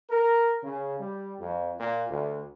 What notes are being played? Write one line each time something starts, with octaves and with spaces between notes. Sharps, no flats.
A#4
C#3
G3
F2
A#2
D2